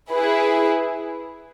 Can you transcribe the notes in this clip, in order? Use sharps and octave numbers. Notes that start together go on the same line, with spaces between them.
E4 G#4 B4